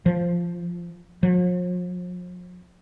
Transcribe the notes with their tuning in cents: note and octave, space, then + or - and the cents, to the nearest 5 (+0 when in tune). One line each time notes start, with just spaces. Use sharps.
F3 -10
F3 +45